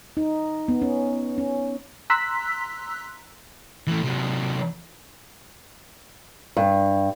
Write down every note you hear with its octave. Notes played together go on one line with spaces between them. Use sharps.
D#4
B3
C#4
C#4
A#5 C6 E6 F#6 B6
E3 A3
C3 F#3
G2